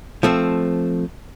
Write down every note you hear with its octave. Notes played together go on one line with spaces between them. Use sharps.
F3 A3 C4